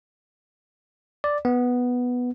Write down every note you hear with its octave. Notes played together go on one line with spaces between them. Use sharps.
D5
B3